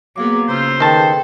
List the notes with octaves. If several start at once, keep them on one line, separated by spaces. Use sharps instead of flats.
F#3 A#3 B3 G#4 F5 D6
C#3 F4 C5 A#5 E6
D#3 G#4 A4 B4 G5 A5